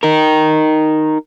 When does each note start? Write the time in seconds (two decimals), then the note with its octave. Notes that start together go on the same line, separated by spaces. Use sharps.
0.03 D#4 A#4